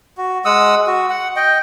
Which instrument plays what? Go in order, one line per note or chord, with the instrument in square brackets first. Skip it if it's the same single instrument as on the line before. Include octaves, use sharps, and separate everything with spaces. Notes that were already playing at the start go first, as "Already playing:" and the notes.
[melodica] F#4
G#3 F#5 D#6 E6
F#4
F#5
D#5 G5